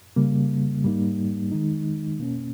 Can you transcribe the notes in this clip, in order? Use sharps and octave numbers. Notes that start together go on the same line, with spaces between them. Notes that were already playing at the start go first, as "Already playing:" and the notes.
C#3 G3 A#3
G#2 G3 A#3 D#4
D#3 G#3 D#4
B2 A#3 C#4